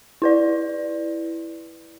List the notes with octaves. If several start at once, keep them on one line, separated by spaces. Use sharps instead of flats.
E4 B4 D5